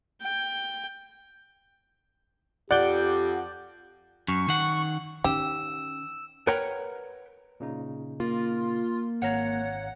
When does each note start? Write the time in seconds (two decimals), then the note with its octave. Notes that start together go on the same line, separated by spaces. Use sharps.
0.22 G5
2.71 F2 G4 D5 F#5 D6 G6
4.28 F#2 C#6
4.48 D#3 F#5
5.24 D#3 C#4 G4 E6 E7
6.47 A#4 B4 C#5 F#5 G5 A#5
7.60 A#2 C#3 D#4
8.20 A#3 F4
9.22 G#1 C#5 F5 F#5 A#5